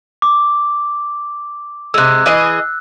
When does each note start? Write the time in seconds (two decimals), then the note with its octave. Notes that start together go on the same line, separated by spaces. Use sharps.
0.22 D6
1.94 C3 G#3 E6 F#6
2.26 E3 G#4 D#5